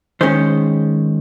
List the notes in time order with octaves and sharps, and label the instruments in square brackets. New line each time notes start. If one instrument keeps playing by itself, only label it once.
[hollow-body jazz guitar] D#3 G#3 C#4 C5